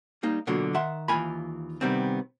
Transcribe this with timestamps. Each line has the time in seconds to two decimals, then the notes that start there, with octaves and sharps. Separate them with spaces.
0.23 G3 A#3 D#4
0.47 B2 D3 F#3 A#3 F4
0.74 D#3 E5 F#5 C6
1.08 D#2 E3 F4 G#5 B5
1.81 C3 D#3 G3 B3 C4